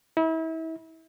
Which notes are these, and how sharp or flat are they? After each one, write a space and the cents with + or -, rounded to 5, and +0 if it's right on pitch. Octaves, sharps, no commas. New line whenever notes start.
E4 -35